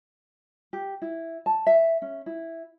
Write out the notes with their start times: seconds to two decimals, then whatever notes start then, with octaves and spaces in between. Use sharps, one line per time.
0.73 G4
1.02 E4
1.46 A5
1.67 E5
2.02 C#4
2.26 E4